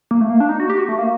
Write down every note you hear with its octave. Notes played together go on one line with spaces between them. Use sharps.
A#3
A3
A#3
D4
D#4
F#4
G4
F#4
A3
A#3